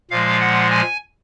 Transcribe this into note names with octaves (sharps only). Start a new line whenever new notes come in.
A#2 F3 G#3 F5
F#5
G#5